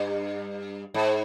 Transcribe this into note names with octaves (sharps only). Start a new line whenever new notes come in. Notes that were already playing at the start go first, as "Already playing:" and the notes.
Already playing: G2
G#2